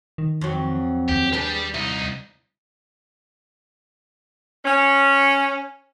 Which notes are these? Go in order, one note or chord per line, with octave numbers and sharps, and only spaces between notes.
D#3
F2 F#3
D#2 G4
G3 D4 G4 G#4 B4
C2 D#4 E4
C#4